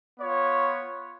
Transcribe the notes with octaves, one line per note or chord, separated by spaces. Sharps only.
B3 F4 C#5